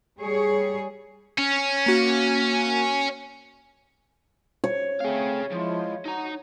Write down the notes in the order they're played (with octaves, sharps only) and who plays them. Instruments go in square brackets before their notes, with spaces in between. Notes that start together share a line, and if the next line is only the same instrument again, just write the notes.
[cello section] G3 G#4 C#5
[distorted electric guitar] C#4
[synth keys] A#3 F#4
[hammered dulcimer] C#5
[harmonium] A3 C4 [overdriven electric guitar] G#4 F5
[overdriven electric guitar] F3 [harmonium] G#3 E4 F4
[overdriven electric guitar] D#4 A#5 [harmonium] F#4